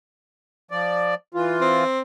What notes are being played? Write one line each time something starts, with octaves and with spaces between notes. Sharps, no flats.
F3 D5
E3 F4
C4